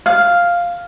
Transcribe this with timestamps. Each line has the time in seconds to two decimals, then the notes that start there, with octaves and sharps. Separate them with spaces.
0.06 F5